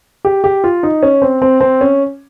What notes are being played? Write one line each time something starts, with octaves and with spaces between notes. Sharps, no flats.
G4
G4
F4
D#4
C#4
C4
C4
C4
C#4